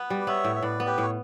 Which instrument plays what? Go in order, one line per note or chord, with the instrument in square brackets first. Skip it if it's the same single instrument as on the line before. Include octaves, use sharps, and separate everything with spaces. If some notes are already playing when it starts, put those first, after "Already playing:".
Already playing: [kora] B3 [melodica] B4
[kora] G3
[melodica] D5
[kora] B3 [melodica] C#5 E5
[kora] A2
[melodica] E5
[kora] A2 [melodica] B4 D5
[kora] B3
[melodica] G4 B4
[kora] A2 [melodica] C#5